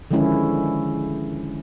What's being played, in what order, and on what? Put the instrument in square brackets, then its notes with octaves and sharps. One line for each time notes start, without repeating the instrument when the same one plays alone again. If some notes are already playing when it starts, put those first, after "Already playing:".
[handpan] D3 D#3 F3 G#3 C#4 E4